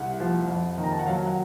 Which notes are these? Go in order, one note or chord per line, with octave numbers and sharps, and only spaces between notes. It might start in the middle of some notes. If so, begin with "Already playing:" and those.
Already playing: C2 F#5
F3
F2
D#3
A#5
A5
F#5
F#3 F5
F#5